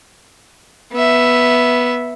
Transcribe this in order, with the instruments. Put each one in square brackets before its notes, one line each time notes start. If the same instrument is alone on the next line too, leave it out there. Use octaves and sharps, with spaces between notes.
[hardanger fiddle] B3 E5